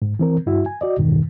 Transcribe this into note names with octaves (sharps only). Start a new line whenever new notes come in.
G#2
E3 C4 A#4
G2 E4 F#4 E5
G#5
F#4 D5 D#5
E2 G2 B2 D#3